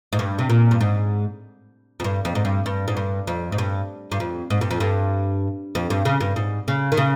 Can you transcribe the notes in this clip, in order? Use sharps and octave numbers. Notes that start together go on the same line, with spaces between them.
G#2
G2
C3
A#2
G2
G#2
F2
G2
F2
G#2
G2
G2
G#2
G2
F2
G#2
G2
G2
F2
G#2
G2
F2
G2
F2
G2
C#3
G2
G#2
C#3
D#3
C#3